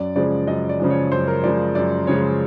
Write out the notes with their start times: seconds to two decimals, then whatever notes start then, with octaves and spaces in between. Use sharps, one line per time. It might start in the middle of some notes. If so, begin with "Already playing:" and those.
Already playing: F#2 D5
0.15 C#3 F3 G#3 D5
0.47 F#2 D#5
0.69 D5
0.80 C#3 F3 G#3
0.90 C#5
1.12 F#2 C5
1.28 A#4
1.44 C#3 F3 G#3 D5
1.75 F#2 D5
2.07 C#3 F3 G#3 C#5